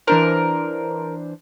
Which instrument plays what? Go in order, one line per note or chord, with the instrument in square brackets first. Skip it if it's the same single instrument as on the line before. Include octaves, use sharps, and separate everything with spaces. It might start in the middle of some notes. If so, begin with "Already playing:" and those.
[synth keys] E3 D4 C5 [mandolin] A#4